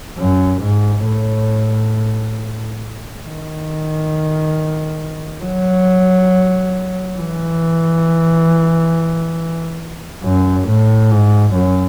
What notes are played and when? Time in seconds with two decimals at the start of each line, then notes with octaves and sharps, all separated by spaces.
0.19 F#2
0.63 G#2
1.07 A2
3.25 D#3
5.44 F#3
7.18 E3
10.24 F#2
10.68 A2
11.11 G#2
11.55 F#2